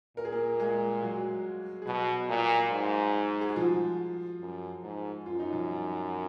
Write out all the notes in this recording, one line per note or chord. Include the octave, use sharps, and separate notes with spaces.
A#2 A#4
G#4
A#3 A#4
G#3 G#4
F#3 F#4
G#4
B2 F#3 F#4
A#2
G#2
G#4
F#4
F3 F4
F#2
G#2
F#2 F4
D#4
F3 F4